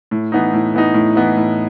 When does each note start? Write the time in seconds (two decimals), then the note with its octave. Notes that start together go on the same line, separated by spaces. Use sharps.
0.11 A2
0.32 E3 B3 D#4
0.53 A2
0.74 E3 B3 D#4
0.94 A2
1.16 E3 B3 D#4
1.37 A2